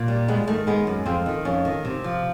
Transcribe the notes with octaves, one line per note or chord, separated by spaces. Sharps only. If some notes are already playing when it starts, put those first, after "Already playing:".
Already playing: A#2
G3
G#3 B3
D#3 A3
G#3 B3
F#2
F2 C4
D#3
F2 C#4
D#3
C3
F3